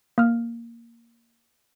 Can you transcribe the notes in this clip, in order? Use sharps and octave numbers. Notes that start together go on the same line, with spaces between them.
A#3 F6